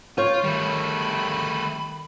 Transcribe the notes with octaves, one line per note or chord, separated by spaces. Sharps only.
F4 C#5 G6
D#3 G3 A3 B5